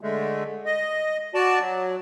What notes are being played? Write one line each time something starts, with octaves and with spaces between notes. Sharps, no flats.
D3 G#3 A3
D#5
F#4 D5 A5
F#3